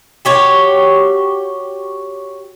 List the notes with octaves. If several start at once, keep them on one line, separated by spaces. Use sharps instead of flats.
F#4 G4 C#5